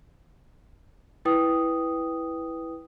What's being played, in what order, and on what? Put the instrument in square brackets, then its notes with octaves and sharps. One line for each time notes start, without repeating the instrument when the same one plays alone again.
[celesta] E4 B4 G5 D#6